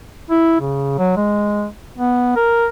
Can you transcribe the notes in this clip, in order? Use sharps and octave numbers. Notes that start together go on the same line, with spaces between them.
E4
C#3
F#3
G#3
B3
A#4